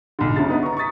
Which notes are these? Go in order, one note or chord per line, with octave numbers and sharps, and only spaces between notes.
B1 D3
G1 D2 C#3 A6
B3 D#4
A#5 C#6
C#6 D#6 A6 B6